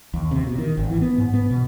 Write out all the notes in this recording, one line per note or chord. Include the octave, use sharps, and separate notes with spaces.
D#2
C3
B2
D#3
G#1
E3
B3
G#2
B3
B2